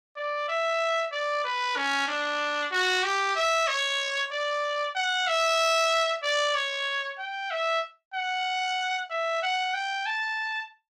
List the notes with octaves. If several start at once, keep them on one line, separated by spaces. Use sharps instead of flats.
D5
E5
D5
B4
C#4
D4
F#4
G4
E5
C#5
D5
F#5
E5
D5
C#5
G5
E5
F#5
E5
F#5
G5
A5